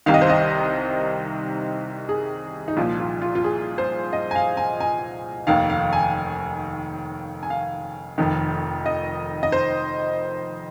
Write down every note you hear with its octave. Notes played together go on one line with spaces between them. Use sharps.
C2 C3 D#3 F5
D#5
C5
D#5
G#4
D#4
C2 A#2 F3 F4
F4
F4
F4
G#4
C5
D#5
G#5
F5
G#5
G#5
F1 D#2 D#3 F5
F5
G#5
G#5
F5
F1 F2 D#3
D#5
D#5
C5